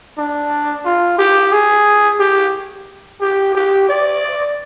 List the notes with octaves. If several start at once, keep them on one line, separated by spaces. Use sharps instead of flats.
D4
F4
G4
G#4
G4
G4
G4
D5